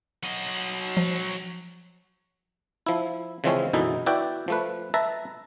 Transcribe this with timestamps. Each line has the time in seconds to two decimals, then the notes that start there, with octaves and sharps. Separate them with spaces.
0.23 F#3 D#5
0.97 F3
2.87 F3 E4
3.44 C#3 E3 F3 G#3 C4 C#4
3.73 F#2 B2 D3 E3 D#4 E4
4.06 E4 F#4 B4 D5 G5
4.48 F3 A3 B4
4.94 B4 E5 A5 A#5